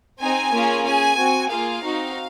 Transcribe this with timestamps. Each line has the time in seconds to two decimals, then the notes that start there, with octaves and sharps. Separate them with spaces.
0.21 C4 D#4 G#4 G#5
0.52 A#3 C#4 F4 G#4
0.85 C#4 G#4 G#5
1.18 C4 F#4
1.50 A#3 F4 G#4 F5
1.84 C4 D#4 F#4